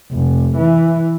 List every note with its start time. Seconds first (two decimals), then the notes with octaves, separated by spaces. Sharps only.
0.12 F1
0.57 E3